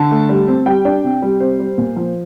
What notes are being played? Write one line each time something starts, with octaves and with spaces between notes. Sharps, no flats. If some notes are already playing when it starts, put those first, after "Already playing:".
Already playing: D3 A5
A3
G3
C4
G3 G5
D4
C3
G3
C3 C5
G3
A#2
F3